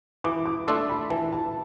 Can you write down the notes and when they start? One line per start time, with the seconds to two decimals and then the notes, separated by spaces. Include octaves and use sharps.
0.24 E3 D6
0.46 D6
0.67 A3 D4 A4 C6
0.89 B5
1.10 E3 A5
1.33 A5